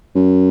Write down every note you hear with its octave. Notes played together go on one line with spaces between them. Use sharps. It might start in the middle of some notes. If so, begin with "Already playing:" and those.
F#2